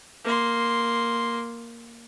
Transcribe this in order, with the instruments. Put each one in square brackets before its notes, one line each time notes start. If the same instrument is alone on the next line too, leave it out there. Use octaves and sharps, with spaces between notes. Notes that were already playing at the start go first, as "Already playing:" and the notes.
[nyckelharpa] A#3 C6